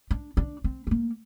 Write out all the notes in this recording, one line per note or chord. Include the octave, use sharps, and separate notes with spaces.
D4
D4
C4
C4
A#3